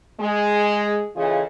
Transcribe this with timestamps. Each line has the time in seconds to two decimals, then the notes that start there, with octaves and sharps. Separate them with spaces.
0.21 G#3
1.16 C#3 E3 F4 G#4 A4 D#5